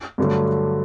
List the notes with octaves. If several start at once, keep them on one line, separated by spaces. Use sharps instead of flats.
G2 D3 F#3 A3